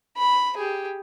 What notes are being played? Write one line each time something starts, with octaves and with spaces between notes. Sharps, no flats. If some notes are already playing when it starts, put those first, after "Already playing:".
B5
G4 G#4